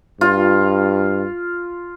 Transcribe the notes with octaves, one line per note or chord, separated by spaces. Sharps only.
G2 F4